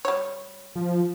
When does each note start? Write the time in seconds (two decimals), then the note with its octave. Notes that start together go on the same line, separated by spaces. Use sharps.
0.05 G3 C#5
0.76 F3